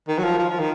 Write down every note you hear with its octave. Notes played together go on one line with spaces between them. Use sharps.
D#3
F#3
F3
F3
F3
D#3